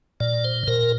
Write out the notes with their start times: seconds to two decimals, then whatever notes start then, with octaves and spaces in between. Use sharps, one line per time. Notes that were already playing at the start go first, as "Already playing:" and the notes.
0.20 A#2 D5
0.44 C5
0.67 A#2 A#4